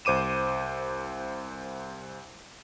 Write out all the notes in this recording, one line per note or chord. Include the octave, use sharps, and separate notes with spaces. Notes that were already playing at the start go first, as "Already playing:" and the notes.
C2 C5 D6 D#7 E7